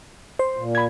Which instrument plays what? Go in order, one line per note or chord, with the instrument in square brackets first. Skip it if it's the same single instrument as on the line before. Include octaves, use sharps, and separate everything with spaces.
[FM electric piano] C5
[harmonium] A#2
[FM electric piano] B5 G#6